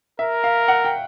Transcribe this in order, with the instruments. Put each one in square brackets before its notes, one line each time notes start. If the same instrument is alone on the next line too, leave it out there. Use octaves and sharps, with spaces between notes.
[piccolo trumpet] A#4 [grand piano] E5
[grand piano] F5
F#5
G5